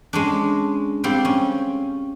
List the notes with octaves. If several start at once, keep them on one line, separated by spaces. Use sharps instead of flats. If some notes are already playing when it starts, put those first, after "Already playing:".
G#3 C#4 D4
G3 C4 F4 G4
C#4